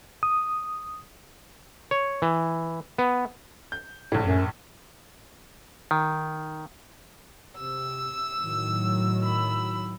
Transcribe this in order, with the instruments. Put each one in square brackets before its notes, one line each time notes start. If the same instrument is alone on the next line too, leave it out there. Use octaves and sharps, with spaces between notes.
[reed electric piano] D#6
[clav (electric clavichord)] C#5
E3
B3
[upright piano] G6
A#1 A2
[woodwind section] F#2
[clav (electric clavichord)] D#3
[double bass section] C3 [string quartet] E6
[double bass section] A2 D#3 F#3
[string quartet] B5 E6